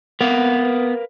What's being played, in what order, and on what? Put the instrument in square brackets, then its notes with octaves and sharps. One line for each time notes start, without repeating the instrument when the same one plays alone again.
[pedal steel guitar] B3 [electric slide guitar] A#4 B4 F5